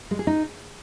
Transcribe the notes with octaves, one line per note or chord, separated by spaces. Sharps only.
G#3
G#4
D#4